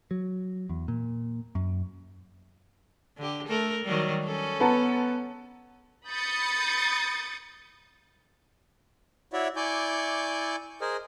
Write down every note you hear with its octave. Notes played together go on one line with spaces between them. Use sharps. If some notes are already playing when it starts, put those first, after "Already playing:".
F#3
E2
A#2
F#2
D3 G4
A3 A4 A#4
D#3 F#3 G3
C#4 A4
B3 A5 A#5
B5 D#6 G6 A6 C#7
E4 F#4 C#5 D5 E5
E4 D5 G#5 C#6 D6 G6
G#4 A#4 C5 D#5 G#5